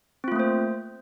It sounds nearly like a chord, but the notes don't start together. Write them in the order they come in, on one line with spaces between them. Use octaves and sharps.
C4 F4 A3 A#3 C5